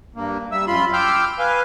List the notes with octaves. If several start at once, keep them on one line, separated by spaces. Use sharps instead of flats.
G2 A#3
G3 E5 E6
F#2 F4 B5 C6
G5 C6 D6 E6 F6 G6
B4 F5 G#5